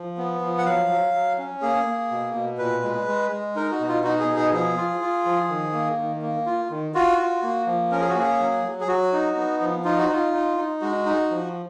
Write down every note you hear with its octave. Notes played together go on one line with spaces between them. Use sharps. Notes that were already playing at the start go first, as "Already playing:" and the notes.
Already playing: F3
B3
F3
F#5
F#3 F5
F#3
F#3
C#4
A#3 G#4
A#3
B2
B2
A#2 B4
G#3
G#3
G#3
D#4 A#4
F#4
B2
F4
D#4 F#4
G#4
B2
G#4
F3 G#4
F4
F4
F3
D#3
A#3
D#3
A#3
F4
D#3
F4 F#4
F4
A#3
F3
C#4 A#4
G#4
F#4
A#3 G#4
F#3
F#3
G#4
F#3 F#4
D#4
B3
F3
D#4 F4
F#4
D#4 F4
D#4
D#4
G#3 F#4
D#4
F3